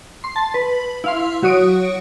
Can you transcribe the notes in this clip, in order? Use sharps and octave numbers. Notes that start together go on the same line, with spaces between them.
C6
A5
B4
E4 F5 C6
F#3 F#4 C#5 D#6 D7